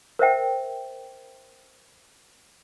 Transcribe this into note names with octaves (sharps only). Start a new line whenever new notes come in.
A#4 C5 E5 G5